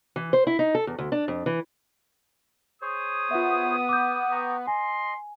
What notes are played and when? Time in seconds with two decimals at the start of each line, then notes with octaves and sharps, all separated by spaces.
0.16 E3
0.33 C5
0.47 E4
0.59 D#4
0.75 A4
0.87 E2
0.98 D2
1.12 D4
1.28 F2
1.46 E3
2.82 G#4 C5 C#5 D#6
3.31 B3 F4 E5
3.89 D6 G6
4.32 G5 A#5 C#6
4.67 D#5 G#5 C6